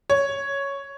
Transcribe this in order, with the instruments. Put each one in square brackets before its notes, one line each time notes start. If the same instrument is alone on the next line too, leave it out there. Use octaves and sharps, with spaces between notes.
[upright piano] C#5